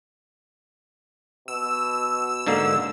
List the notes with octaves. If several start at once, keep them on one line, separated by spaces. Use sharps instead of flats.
B2 E6
G#2 D3 A#3